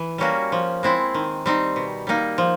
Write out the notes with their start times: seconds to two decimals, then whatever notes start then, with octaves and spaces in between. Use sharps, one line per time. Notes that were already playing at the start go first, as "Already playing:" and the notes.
Already playing: E3
0.18 G3 A#3 C#4 F#4
0.52 F3
0.83 G#3 C4 E4
1.14 D#3
1.46 G3 C4 D#4
1.76 B2
2.07 G3 A#3 D#4
2.38 F3